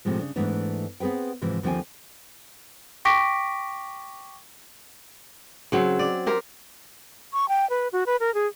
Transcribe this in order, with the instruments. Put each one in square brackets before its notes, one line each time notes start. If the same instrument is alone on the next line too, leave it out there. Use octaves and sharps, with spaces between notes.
[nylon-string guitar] A2 C3 F3 G#3
C#3 D4
G#2 E3 A3 B3 D4
B3 C4 G#4 B4 G5
G#2 C3 E3 F3
D#2 D3 F3 C4 G5 G#5
[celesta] G5 C#6 D6 A#6 B6 D7
[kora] C#3 F#3 C4
D5
G4 A#4 C5
[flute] C#6
G5
B4
F#4
B4
A#4
G#4